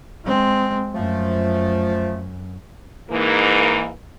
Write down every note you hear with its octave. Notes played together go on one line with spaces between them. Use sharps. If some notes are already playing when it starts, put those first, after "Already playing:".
G#3 C4
F#2 F3 A3
G#2 E3 A#3